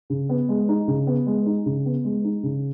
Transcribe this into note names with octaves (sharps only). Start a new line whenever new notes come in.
C#3
B3
G#3
D#4
C#3
B3
G#3
D#4
C#3
B3
G#3
D#4
C#3